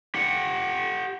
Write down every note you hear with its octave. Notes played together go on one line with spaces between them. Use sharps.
G4 F#5